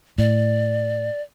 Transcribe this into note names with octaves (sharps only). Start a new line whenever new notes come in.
A2 D5